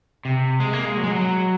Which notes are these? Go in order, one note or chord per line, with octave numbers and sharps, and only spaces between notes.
C3
G#3
A#3
G#3
F#3
G#3
F#3